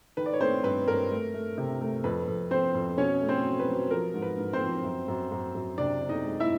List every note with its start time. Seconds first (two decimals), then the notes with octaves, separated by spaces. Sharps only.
0.17 D#3 B4
0.26 D5
0.33 C#5
0.40 A3 C4 C5
0.63 G2 B4
0.87 G2 A#4
1.10 A3
1.34 A3
1.58 C3
1.81 A3
2.04 F2 B4
2.27 F2
2.51 F2 C4 C5
2.74 F2
2.97 B2 C#4 C#5
3.21 A3
3.29 C4 C5
3.44 F#3
3.59 B4
3.68 F#3
3.91 F3 A#4
4.14 G#2
4.22 B4
4.38 G#2
4.53 C4 C5
4.61 F3
4.84 F#2
5.08 F#2
5.31 F#2
5.55 F#2
5.78 C3 D4 D5
6.01 C3
6.09 D#4 D#5
6.25 G#3
6.40 E4 E5